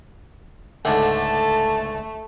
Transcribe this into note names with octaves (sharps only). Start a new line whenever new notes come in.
C#2 G#2 D3 A3 A5